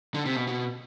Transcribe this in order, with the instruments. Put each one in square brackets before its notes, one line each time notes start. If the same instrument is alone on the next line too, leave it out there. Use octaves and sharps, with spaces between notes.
[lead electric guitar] D3
C3
B2
B2